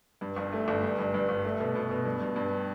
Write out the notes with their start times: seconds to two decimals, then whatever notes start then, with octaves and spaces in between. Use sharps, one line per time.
0.21 G2
0.36 G1
0.53 A3
0.68 G1
0.83 G2
0.98 G2
1.14 G2
1.29 G1
1.45 A3
1.60 B2
1.75 B2
1.91 B2
2.05 G2
2.21 G2
2.36 G2